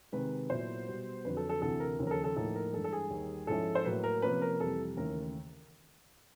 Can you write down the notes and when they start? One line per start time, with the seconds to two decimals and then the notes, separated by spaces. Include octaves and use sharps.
0.12 C3 D#3 G#3 B4
0.50 A#2 F#3 B3 E4 C5
0.87 B2 G3 B3
1.24 F2 D3 F#3 B4
1.37 A4
1.49 A4
1.62 D2 C3 E3 A4
1.80 A#4
1.99 D#2 C#3 F3
2.07 A#4
2.11 A4
2.24 A4
2.36 A2 F3 A#3 D#4 A4
2.55 A#4
2.73 G2 E3 G#3 A4
2.84 A4
2.93 G#4
3.10 D#2 D#3 G3
3.47 G#2 F3 G#3 C#4 E4 A4
3.75 C5
3.85 A2 F#3 A#3 B4
4.04 A#4
4.22 C3 F3 A#3 C#4 B4
4.42 A#4
4.59 F2 C3 E3 G3 A4
4.97 D#2 C#3 E3 A3 A#4